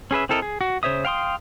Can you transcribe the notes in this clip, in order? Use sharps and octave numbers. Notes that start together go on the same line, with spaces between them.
C#4 G#4 B4 E5
C4 E4 A4 A#4 D#5
G#4
F#4
C#3 C5 C#5 E5 D#6
F5 G5 C6 D#6